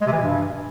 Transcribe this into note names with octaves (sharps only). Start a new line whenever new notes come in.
G#3
C3
E3
B2
G2